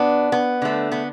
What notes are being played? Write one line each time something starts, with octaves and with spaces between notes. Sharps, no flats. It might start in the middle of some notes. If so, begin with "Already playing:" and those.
Already playing: B2 B3 D4
B3
D3 A3
B3